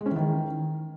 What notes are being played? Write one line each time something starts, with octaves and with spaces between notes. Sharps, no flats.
G#3
C#4
E3
D#3